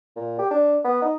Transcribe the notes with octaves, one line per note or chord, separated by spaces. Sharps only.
A#2
G4
D4
B3
D#4